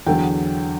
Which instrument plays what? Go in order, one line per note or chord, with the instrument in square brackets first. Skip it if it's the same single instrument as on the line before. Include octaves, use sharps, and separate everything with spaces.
[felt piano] E2 D3 F#3 G5